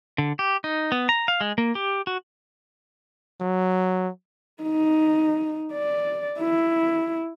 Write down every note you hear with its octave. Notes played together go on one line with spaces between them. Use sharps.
D3
G4
D#4
B3
A#5
F5
G#3
A#3
G4
F#4
F#3
D#4
D5
E4